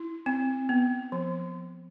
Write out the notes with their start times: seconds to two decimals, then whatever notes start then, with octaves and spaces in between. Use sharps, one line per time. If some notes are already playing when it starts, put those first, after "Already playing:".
Already playing: E4
0.26 C4
0.69 B3
1.12 F3